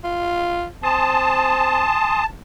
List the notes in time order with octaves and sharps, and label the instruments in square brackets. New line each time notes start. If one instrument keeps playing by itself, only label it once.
[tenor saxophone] F4
[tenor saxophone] C4 [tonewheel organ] G#5 C6 D#6 [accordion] A5